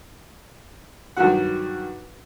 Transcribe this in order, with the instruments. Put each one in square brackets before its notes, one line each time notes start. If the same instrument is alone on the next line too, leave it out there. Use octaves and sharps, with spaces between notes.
[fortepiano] G2 D#3 F#3 F#4 F#5